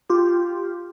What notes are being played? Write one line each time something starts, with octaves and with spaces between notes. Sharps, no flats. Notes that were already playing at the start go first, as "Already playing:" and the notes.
F4 G4